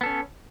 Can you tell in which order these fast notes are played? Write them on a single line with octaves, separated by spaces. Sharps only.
B3 A4 C#4